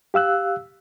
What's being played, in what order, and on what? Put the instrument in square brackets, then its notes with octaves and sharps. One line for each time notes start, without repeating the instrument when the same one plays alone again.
[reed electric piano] G4 F5 E6 F#6